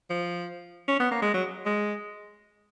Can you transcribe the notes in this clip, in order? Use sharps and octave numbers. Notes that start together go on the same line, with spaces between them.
F3
C#4
B3
A#3
G#3
F#3
G#3